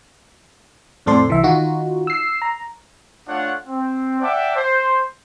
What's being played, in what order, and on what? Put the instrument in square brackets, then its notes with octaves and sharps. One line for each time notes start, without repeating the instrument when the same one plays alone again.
[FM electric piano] F2 A2 C4 A4 D5 C6
C2 E3 E5
D#3 D#4 F4 F#4
E6 C7
A#5
[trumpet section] A3 D4 F4 C#5 F#5
C4
D5 E5 F#5 G5 A5 D6
C5